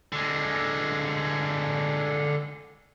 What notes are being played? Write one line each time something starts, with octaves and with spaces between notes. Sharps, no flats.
D3 G#3